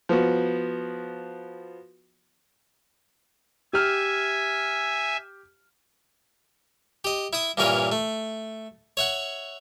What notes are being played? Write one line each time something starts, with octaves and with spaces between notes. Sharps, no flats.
F3 B3 F#4
G4 E5 G#5 F6
G4 D#5
E4 E5 D#6
G2 A#2 E3 C#4 A#4 C#5
A3
C#5 E5 F#5